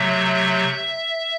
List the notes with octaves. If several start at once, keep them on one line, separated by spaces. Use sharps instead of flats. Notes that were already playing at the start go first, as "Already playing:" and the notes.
Already playing: C3 F#3 A3 E5